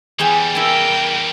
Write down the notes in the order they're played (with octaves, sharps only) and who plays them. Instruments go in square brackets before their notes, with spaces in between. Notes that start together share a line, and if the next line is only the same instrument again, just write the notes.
[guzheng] E2 G#4 G5 [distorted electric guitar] E3 G3
[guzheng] E4 G#5 [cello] A#4 G5